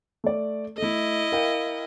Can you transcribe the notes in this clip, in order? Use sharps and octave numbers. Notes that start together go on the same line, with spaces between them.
A3 D5
A3 E4 A4 D#5
A#4 F5 G5